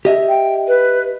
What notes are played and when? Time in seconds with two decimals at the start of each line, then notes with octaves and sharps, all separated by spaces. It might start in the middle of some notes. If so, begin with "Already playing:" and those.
0.05 G4 D#5 E5
0.29 G5
0.68 B4